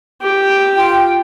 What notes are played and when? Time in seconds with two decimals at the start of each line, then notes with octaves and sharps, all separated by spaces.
0.22 G4
0.76 F4 G5